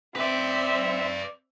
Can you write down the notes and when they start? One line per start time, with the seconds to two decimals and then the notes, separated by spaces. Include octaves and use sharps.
0.16 C4 B4 D5 E5